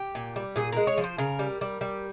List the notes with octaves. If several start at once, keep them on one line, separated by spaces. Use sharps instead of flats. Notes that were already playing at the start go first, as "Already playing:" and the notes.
Already playing: G4
A#2
G3
A#2 G#4
G#3 A#4
C#5
F3
C5
C#3 A#4
G3
G3
G3